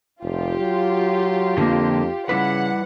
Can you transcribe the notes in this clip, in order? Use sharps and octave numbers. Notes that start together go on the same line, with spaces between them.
F1 F4 G4
F#3
F2 D3 A#3
C#3 G3 E4 B4 F#5